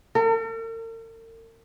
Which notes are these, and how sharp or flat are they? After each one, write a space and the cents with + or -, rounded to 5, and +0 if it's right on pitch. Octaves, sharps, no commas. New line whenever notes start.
A#4 -45